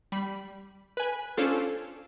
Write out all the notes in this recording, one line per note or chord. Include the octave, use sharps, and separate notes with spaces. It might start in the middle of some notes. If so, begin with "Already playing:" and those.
G3 B5
B4 G#5
C#4 D4 F4 A4 C5